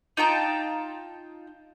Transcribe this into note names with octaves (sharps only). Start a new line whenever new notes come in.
D#4 F4 G5 A5